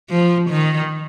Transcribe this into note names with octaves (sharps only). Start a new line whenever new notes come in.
F3
D#3